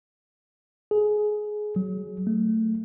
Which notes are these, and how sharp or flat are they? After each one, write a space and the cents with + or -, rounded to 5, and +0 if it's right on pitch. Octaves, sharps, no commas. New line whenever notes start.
G#4 +20
F#3 +15
A3 +15